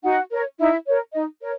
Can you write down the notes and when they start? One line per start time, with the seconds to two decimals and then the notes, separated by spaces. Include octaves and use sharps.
0.03 D#4 F#4 F#5
0.31 A#4 C#5
0.59 D#4 E4 E5
0.87 A#4 C#5
1.14 D#4 D#5
1.41 A#4 C#5